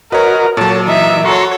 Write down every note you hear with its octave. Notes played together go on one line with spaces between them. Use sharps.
F#4 A#4 B4 C#5 D#5
A#2 F#3 A4 C#5 A5
E3 D#4 E5
F#4 A4 C#5 A#5 C6 C#6